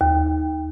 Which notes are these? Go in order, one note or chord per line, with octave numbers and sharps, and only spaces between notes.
D#2